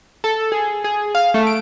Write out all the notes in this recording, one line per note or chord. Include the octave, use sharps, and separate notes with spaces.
A4
G#4
G#4
F5
A3
D7